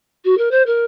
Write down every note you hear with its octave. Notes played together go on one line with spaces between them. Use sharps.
F#4
A#4
C5
A#4